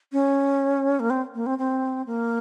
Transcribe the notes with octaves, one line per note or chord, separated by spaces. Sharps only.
C#4
A#3
C4
A#3
C4
C4
A#3